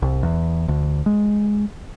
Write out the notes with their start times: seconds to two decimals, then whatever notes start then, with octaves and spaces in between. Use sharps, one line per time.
0.02 C2
0.23 E2
0.68 D2
1.06 G#3